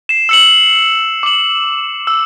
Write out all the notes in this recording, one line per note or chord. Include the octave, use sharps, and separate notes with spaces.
C7 E7
E6 C#7 F#7
D6 F#7
E6